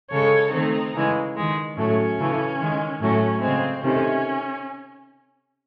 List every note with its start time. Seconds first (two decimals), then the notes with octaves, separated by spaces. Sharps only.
0.11 C#3 G#3 A4 C#5
0.53 D#3 A3 C4 D#4
0.94 C#3 E3 G#3
1.36 D#3 G#3
1.76 A2 F#3 A3 C#4
2.18 C#3 E3 A3
2.60 D#3 G#3
3.01 A2 F#3 A3 C#4
3.42 C#3 G#3 C4
3.83 C3 D#3 A3 C#4